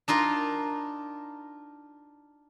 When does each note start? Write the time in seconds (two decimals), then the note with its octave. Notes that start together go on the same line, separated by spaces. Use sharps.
0.08 D4 D#4 F4 A#4